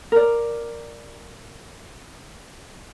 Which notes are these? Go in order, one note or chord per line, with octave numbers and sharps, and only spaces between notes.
A#4 D5